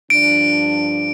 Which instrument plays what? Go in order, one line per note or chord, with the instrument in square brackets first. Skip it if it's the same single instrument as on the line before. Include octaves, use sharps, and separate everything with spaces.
[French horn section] G2 F3 D4 [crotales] D7